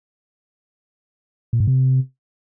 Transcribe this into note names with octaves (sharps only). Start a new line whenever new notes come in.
A#2
G#2
C3